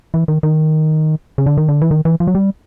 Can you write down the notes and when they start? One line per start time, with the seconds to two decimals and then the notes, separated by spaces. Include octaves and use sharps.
0.14 E3
0.28 D#3
0.43 D#3
1.38 C#3
1.46 D3
1.57 D#3
1.68 D3
1.82 E3
1.91 D#3
2.05 E3
2.20 F3
2.27 F#3
2.35 G3